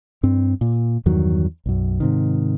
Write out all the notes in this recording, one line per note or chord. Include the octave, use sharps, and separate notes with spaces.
G2 C4
A#2
E2 G2 D#3 F#3
B1 F#2
G#2 C3 D#3